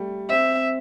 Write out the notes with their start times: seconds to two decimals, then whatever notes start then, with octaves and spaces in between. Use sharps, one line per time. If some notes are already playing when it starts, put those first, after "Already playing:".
Already playing: G3 A3
0.29 C4 E5